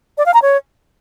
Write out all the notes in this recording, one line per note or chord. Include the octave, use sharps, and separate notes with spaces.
D5
F5
A#5
C#5